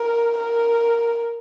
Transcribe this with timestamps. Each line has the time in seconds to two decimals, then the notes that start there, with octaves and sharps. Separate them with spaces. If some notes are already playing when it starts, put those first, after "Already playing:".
Already playing: A#4
0.38 A#4